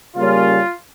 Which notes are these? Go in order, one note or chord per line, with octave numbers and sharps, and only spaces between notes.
C#3 G3 A#3 C#4 F4